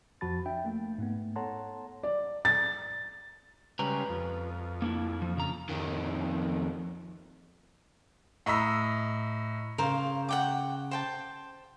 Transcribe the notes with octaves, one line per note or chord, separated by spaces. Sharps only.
F2 F3 F#4 A5 B5 A6
D4 E5 G5
A3 A#3
G#2 A3 B3
A4 C#5 F#5 A5 A#5 C6
D5
A6
C#3 G3 G#3 B4 A#5
F2
A#3 D4 E4
F3
C#3 A#5
F2 D#3
A2 D#5 A#5 E6 B6
C#3 A#4 C5 F5
F#5 G5 D6
C5 G5 A5